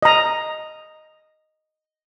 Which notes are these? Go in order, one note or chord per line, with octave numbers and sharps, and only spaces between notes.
D#5 A#5